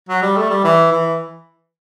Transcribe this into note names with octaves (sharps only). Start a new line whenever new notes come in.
F#3
G3
A3
G3
E3
E3